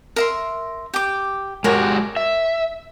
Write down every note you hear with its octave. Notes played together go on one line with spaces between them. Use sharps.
A#4 E5 C6
G4 D6
G#3 F#4 G4 A#4 C#5
E5